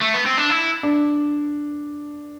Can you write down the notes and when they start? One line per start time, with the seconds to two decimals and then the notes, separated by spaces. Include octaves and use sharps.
0.02 A3
0.14 B3
0.26 C4
0.38 D4
0.50 E4
0.83 D4